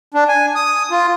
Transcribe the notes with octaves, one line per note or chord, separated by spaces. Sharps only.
D4
G#5
D#6
F4